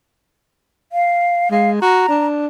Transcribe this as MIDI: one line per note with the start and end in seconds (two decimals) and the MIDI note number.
0.92 1.49 77
1.51 1.80 56
1.51 1.70 77
1.81 2.05 66
1.81 2.26 82
2.09 2.48 62